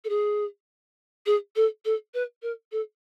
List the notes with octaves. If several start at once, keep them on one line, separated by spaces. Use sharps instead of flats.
A4
G#4
G#4
A4
A4
B4
A#4
A4